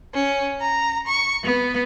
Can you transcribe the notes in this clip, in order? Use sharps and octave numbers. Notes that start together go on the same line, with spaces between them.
C#4
A#5
C#6
B3